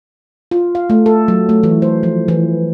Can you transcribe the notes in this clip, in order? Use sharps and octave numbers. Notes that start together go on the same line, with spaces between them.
F4
F5
A3
A4
F#3
A3
E3
C5
F3
E3